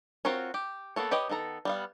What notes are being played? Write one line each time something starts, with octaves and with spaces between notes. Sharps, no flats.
C4 F4 F#4 A#4 C#5
G4
A#3 B3 A4 C#5
G4 B4 C#5 D#5 G5
D#3 B3 A4 A#5
G3 B3 F5